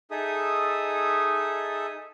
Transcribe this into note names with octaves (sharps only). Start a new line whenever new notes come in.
D#4 G#4 A4 E5 D#6